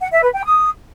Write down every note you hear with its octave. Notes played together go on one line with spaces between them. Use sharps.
F#5
E5
B4
G5
D#6